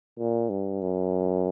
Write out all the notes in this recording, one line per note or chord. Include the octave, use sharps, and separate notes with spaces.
A#2
G2
F#2